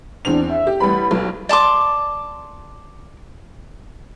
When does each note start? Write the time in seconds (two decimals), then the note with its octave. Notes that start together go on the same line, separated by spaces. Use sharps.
0.25 E2 C4 D4 F7
0.50 E5
0.67 G4
0.80 A1 G3 B4 B5
1.11 B1
1.49 D5 A5 C6 D6